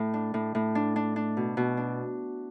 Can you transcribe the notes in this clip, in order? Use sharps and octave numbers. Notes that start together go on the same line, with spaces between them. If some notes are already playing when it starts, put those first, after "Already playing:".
Already playing: A2
D4
A2
A2
D4
D4
D4
B2
B2
D4